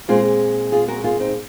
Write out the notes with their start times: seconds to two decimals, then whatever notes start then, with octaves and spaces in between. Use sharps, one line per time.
0.08 A#2 G#3 C4 F4 G#4
0.72 F4 G#4
0.88 F#4 A#4
1.04 F4 G#4
1.20 C4 D#4